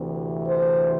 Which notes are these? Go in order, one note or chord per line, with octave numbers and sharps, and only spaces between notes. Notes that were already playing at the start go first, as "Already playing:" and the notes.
Already playing: D2 C3 E3
C5